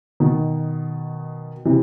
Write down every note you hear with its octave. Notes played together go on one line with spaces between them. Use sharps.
B2 D#3
C3 E3